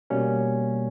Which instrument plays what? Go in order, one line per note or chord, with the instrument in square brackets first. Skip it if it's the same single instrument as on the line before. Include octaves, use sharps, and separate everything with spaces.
[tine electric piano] B2 G3 A#3 C#4